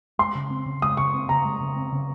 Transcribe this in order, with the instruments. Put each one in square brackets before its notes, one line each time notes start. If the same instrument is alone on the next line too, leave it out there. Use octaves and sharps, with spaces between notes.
[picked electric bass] G#3 [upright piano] C6
[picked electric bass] C#3
C4
C#3
[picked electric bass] G#3 [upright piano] D#6
[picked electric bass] C#3 [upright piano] C#6
[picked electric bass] C4
[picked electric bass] C#3 [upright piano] A#5
[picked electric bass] G#3
C#3
C4
C#3